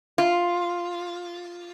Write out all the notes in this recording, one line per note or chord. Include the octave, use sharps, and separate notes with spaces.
F4